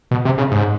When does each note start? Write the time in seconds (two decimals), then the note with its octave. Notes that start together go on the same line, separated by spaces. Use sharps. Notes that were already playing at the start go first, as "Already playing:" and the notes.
0.11 B2
0.25 C3
0.38 C#3
0.51 G#2